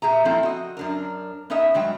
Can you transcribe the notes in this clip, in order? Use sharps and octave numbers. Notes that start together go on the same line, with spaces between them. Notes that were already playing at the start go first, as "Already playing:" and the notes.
A#2 G#4 E5 A#5
F3 A3 A#3 C4 E4
F#4 D#5
F#2 D4 A#4
B3 C#4 D#4 D#5 E5
G2 F#3 G#3 G5